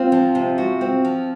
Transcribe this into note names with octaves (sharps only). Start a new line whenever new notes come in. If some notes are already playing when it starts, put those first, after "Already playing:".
Already playing: C4 F4
F3
C3
F#4
C4
F3